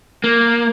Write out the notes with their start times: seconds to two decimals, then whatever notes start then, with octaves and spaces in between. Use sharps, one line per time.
0.24 A#3